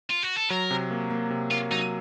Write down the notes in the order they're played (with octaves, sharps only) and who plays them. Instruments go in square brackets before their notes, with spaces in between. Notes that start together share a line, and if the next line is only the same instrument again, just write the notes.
[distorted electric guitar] F4
F#4
A4
[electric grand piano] F#3 [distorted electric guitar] A#4
[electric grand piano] C3
A#3
A#3
C3
[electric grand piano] A#3 [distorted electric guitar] F4
[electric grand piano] F#3 [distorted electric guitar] D#4